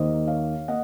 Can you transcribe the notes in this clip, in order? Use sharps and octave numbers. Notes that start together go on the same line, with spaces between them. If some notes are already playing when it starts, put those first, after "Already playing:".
Already playing: D#2 D#3 A#3 C5 D#5
C#5 F5
A#3 D#5 F#5